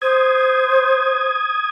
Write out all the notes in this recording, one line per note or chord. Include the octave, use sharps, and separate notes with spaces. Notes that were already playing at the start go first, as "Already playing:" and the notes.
C5 D#6 G#6